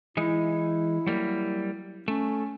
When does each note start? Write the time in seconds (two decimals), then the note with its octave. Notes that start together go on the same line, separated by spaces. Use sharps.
0.17 E3 G#3 D#4 E4
1.06 F#3 G3 A#3
2.08 A3 C#4